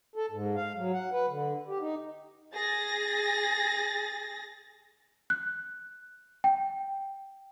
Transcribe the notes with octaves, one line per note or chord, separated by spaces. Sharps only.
A4
G#2
F5
F#3
F#5
B4
D3
G4
D#4
G#4 A6 A#6
F#6
G5